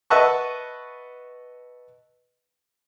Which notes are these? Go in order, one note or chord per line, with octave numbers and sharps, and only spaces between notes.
B4 D#5 E5 F#5 A5 C#6